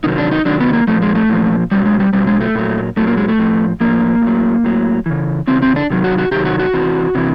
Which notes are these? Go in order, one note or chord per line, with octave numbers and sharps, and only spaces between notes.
C3 D#3 F#3 D#4
D4
D#4
C3 D#3 F#3 D4
B3
A#3
A#2 F3 A3
G#3
A3
A#2 F3
B2 F#3 G3
G#3
G3
B2 F#3 G3
G#3
A3
A#2 F#3
A#2 F#3 A3
A#3
G#3
A3
A2 F3
A2 F3 A#3
A2
F#3
A2 F#3
C#3 E3
C#3 E3 C4
C4
D4
C3 D#3 F#3
F#4
F#4
C3 D#3 F#3 G4
F#4
F#4
C3 E3
C3 E3